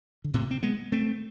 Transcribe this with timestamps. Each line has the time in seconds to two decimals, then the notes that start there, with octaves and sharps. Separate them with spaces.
0.24 D3
0.34 A2 C3
0.51 C4
0.63 G#3 B3
0.92 A3 C4